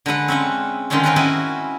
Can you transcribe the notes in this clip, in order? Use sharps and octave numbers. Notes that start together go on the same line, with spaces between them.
D3 G#3 B4 F#5
C4 C#4 E5 F#5
D3 D#3 G#3 C4 C#4 F4
C4 A#4 B4 F#5
C#4 E4 F#4 G#4 B4